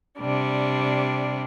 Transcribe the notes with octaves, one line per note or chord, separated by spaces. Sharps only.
C3 G3 D4